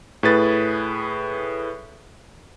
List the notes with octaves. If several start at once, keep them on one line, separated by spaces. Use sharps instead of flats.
A2 G#4 B4 A6